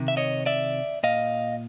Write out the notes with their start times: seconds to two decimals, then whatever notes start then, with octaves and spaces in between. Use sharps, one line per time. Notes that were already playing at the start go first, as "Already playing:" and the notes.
Already playing: C3 D#3
0.08 E5
0.17 C#5 D#5
0.46 D5 E5
1.03 A#2 D#5 F5